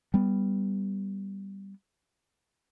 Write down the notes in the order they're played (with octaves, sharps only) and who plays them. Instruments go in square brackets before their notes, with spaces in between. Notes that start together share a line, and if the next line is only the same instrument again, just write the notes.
[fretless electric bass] G3 B3